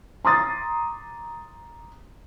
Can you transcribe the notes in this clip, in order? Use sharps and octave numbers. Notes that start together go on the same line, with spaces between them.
A#5 C6 D6 D#6 A6